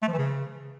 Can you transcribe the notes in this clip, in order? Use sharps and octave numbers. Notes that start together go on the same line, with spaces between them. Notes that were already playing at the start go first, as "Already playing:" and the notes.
A3
F3
E3
C#3